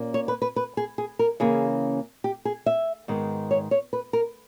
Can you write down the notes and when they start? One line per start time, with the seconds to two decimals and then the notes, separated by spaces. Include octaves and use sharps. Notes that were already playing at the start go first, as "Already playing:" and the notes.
Already playing: A#2 A#3 C#4
0.14 C#5
0.28 B4
0.42 B4
0.56 B4
0.77 G#4
0.98 G#4
1.19 A#4
1.40 C#3 E3 A#3 C#4 G#4
2.24 G4
2.45 G#4
2.66 E5
3.08 G#2 D#3 G#3 B3
3.51 C#5
3.71 C#5
3.93 B4
4.13 A#4